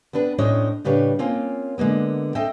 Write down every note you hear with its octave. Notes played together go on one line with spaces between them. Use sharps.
B3 C4 D4 B4
A2 C#4 D4 C5 C#5 D#5
A2 C#3 G3 D4 B4 C#5
A#3 C4 C#4 F4
D3 G#3 A#3 B3
C4 A4 D#5 E5 G5